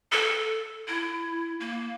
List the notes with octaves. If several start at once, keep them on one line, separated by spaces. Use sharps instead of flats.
A4
E4
A#3